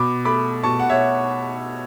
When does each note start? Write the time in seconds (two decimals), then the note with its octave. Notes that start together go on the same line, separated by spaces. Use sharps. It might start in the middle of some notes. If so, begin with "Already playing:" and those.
Already playing: B2 B5 D6
0.25 A3 B5 D6
0.63 B2 A5 C#6
0.80 F#5
0.89 C#5 E5